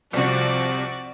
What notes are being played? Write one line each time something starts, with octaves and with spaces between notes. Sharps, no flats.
C2 C3 F3 F#4 D5